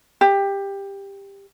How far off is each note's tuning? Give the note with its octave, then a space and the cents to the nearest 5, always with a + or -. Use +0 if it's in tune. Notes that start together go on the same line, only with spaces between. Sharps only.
G4 +15